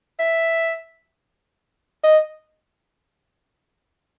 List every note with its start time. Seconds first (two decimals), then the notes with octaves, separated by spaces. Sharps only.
0.19 E5
2.04 D#5